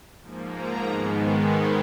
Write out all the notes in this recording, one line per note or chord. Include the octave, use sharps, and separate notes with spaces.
G#2 F3 A#3
A#5
G#2 D#3 G#3 B3